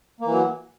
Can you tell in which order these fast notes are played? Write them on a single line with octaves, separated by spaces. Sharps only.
A#3 E3 F#3